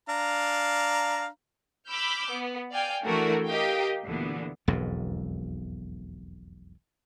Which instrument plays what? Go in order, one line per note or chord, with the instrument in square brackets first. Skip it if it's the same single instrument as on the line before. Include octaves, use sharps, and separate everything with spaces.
[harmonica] D4 F5 A#5
[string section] B5 D6 E6 F6 G6
B3
D5 F5 G5 G#5
E3 A3 D4 E4 F#4 A#4
G4 A#4 D#5 F5 G5
D2 A#2 D3 E3 B3
[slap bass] E1 B1 F2 G#2